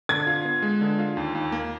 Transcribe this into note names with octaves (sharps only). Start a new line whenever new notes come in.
D3 G#6
F4
B3
G#3
D3
F4
D#2
D#2
A#3